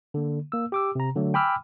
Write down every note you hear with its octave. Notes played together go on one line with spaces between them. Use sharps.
D3 A#3
A#3 E6
G4 D6 E6
C3 A#5
D3 F#3 A3
G5 G#5 B5 D6 E6 F6